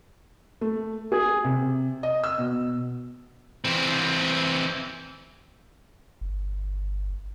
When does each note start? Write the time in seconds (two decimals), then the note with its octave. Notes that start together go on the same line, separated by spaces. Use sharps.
0.61 A3
1.12 G#4
1.44 C3
2.03 D#5
2.24 E6
2.38 B2
3.65 E3 C4
6.21 G1